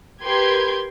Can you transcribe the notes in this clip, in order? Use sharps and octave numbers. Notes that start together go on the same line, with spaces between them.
G4 A#4 B4 C6 G6 G#6